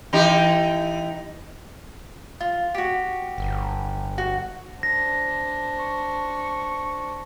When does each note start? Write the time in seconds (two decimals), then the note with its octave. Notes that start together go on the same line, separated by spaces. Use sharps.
0.13 E3 D#4 G4
2.41 F4
2.75 F#4 G4
3.38 G1
4.18 F#4
4.83 D4 C5 A#6
5.79 C#6